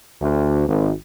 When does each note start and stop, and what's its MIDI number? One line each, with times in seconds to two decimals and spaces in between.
0.20 0.67 38
0.67 0.89 32